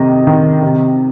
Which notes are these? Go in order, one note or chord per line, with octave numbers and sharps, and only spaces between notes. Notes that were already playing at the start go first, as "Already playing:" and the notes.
Already playing: C3 D#3 D#5
D#3
C3